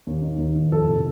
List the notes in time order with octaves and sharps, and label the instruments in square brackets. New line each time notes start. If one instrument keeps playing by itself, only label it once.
[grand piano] D#2
D#3
D#2
D#3
F2 A4
C3